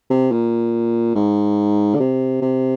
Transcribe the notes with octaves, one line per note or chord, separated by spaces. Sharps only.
C3
A#2
G#2
D3
C3
C3